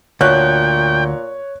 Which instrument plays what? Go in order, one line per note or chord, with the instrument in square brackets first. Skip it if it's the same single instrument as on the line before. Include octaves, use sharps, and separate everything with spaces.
[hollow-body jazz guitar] D2 [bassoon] A#2 [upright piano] C#5 F#6 [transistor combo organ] G5